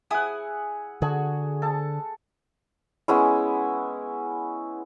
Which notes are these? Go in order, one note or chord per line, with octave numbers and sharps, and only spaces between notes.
E4 G#4 F#5 G#5 D#6
D3 F#4 G#4
A4 A5
G#3 B3 C#4 E4